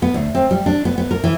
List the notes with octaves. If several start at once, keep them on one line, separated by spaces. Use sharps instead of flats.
B3
D2
C4
G3
D4
B3
B3
A#4
E3